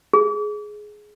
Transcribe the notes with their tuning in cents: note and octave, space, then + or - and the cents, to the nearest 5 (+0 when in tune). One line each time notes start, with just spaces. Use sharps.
G#4 +10